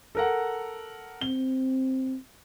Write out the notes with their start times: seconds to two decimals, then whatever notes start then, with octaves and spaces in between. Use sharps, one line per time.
0.15 A4 A#4 F#5
1.21 C4 G7